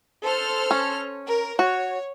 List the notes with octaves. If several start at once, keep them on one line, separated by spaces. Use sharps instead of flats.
A4 C5 F6
C#4
A#4
F#4 C#5